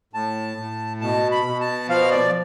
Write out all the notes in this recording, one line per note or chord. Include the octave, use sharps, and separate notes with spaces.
A2 A5
A2
B2 A5
B5
B2
A5
F3 F5
D5